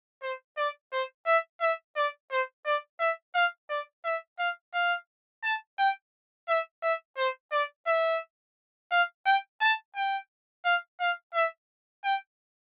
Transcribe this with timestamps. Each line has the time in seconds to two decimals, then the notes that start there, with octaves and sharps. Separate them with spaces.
0.22 C5
0.58 D5
0.92 C5
1.27 E5
1.61 E5
1.96 D5
2.31 C5
2.66 D5
3.00 E5
3.35 F5
3.70 D5
4.05 E5
4.39 F5
4.74 F5
5.43 A5
5.79 G5
6.48 E5
6.83 E5
7.17 C5
7.52 D5
7.87 E5
8.91 F5
9.26 G5
9.61 A5
9.96 G5
10.65 F5
11.00 F5
11.35 E5
12.04 G5